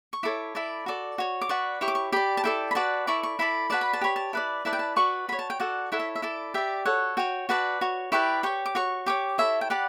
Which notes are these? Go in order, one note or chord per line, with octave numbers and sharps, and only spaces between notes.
C#6
E4 A4 C#5 D6
E4 A4 D5
F#4 A4 D5
F#4 C#5
D6
F#4 B4 D5 C#6
E4 G4 C#5 C#6
D6
C#6
G4 D5 B5
A5
E4 A4 D5 G5
B5
F#4 B4 D5 A5
E4 A4 D5 C#6
C#6
E4 A4 D5 B5
F#4 B4 D5 A5
B5
A5
G4 C#5 B5
A5
E4 B4 D5
E4 B4 D5 A5
G5
A5
F#4 B4 D5 C#6
F#4 C#5 B5
A5
G5
F#4 A4 D5 F#5
E4 A4 C#5 F#5
E5
E5
E4 A4 D5
G4 D5 E5
F#4 A4 C#5 F#5
F#4 C#5 G5
F#4 B4 D5 A5
F#4 C#5
E4 G4 B4 D5 C#6
G4 C#5 C#6
D6
F#4 C#5 C#6
G4 C#5 D6
E4 A4 C#5 E5
G5
G4 B4 D5 F#5